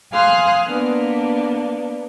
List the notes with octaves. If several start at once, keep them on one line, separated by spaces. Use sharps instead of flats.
F5 G#5 C6 D#6 F6 F#6
A#3 B3 D4